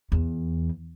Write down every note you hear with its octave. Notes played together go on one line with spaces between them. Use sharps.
E2